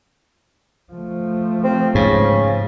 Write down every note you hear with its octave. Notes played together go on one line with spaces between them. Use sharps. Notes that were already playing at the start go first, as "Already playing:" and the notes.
F3 A3
C4
G#2 C#3